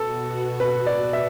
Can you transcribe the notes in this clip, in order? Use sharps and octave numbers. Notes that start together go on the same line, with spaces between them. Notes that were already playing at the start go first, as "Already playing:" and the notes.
Already playing: B2 B3 F#4 A4
B4
D5
E5